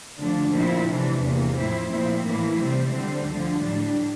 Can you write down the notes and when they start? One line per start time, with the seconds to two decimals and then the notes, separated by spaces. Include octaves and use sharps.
0.18 D3 F3 A3 D4
0.54 A#2 F3 C4 E4
0.87 C3 E3 A3 D4
1.21 E2 C3 E3 A#3
1.56 A2 F3 C4 E4
1.90 A#2 F3 C4 E4
2.24 A2 E3 A#3 E4
2.58 C3 G3 C4
2.92 D3 G3 C4
3.26 D2 D3 F3
3.60 A2 G3 D4